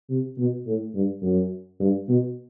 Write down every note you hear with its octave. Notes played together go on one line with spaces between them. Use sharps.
C3
B2
A2
G2
F#2
G2
B2